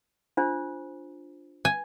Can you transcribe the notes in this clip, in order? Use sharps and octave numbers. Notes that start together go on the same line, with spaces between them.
D4 F4 C5
G#5